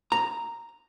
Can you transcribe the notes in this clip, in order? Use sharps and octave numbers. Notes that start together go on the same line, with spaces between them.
A#5